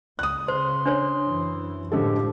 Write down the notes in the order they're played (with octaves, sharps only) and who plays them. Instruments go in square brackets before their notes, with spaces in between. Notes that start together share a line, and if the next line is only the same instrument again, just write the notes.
[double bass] C#2 [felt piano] D#6 F#6
[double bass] C#3 [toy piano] C5 [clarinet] C6
[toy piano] D4 C5 C#5
[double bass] F#2 E3
[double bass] A2 F3 [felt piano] D3 G#3 A4 [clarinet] G4